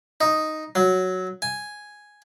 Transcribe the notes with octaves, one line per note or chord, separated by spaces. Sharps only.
D#4
F#3
G#5